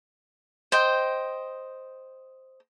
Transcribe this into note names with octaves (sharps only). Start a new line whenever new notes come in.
C5 D#5 G5